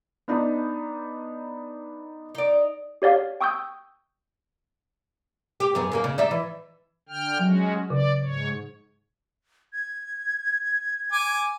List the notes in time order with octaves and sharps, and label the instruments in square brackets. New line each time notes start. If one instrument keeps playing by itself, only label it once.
[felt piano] B3 D4 D#4
[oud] D#4 D5
[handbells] G4 C#5 D5 F5
G5 C#6 D#6 E6 G6
[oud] G4
F#2 B3 G#4
D#2 A#3 D#4
C#3
D#4 D5 E5
E3
[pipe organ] D3 G5 F6
[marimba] F#3 [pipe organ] G#3 C#4 F#4
[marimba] C#3 [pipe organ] D5
[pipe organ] G#2 C#5
[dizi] G#6
[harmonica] G#5 D6